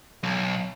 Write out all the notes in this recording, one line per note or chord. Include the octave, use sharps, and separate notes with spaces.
B1